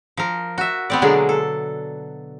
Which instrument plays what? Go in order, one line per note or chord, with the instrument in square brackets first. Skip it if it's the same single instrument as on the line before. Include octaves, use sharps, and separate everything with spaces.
[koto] F3 A#4
F#4 E5
B3 C4 D5
B2 D3 F#3 G#3 A#3 G#4
A4